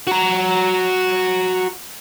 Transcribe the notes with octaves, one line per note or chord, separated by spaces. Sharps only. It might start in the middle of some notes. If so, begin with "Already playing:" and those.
F#4 A#5